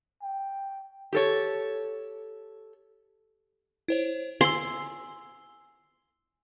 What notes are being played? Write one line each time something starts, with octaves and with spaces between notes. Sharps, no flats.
G5
G4 A4 C#5
E4 C5 C#5
G#5 C6 E6